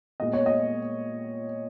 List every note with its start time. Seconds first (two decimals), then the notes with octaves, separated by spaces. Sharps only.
0.20 A#2 G#3 B3 D#5
0.33 C#5
0.46 D#5